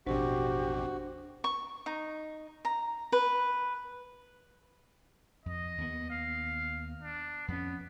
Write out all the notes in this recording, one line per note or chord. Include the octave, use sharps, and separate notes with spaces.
A1 F2 B2 D4 F#4 G4 C5
C#6
D#4
A#5
B4
F2 D#5
D#2 B3
F5
D4
F2 B3 C#4